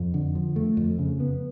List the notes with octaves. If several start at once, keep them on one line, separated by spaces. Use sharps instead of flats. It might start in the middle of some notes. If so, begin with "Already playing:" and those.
Already playing: F2
D3
F3
A3
F2
C#3
B3